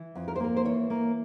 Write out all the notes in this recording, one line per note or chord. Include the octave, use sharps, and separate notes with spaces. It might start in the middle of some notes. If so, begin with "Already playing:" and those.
Already playing: E3
F2
A#4
C5
A#3 A#4
C5
E3 C#5
A#3